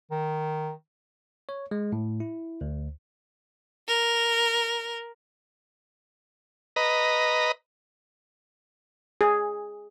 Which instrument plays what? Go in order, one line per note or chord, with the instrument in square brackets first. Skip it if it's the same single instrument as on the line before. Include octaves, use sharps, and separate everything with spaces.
[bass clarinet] D#3
[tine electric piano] C#5
G#3
A2
E4
D2
[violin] A#4
[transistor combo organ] B4 D#5 A#5
[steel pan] G#4